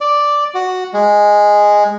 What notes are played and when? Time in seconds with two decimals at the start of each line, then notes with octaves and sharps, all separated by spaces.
0.01 D5
0.55 F#4
0.94 G#3